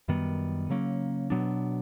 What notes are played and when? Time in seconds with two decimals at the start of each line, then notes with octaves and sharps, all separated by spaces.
0.08 F#2 D#3 G3 B3
0.70 C#3 F#3 A#3 C#4
1.30 B2 F#3 B3 D4